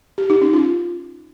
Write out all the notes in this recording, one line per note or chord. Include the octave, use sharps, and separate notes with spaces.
G4
D#4
C#4
F4